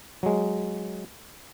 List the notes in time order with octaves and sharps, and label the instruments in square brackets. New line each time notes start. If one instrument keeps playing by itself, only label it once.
[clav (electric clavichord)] F#3 G#3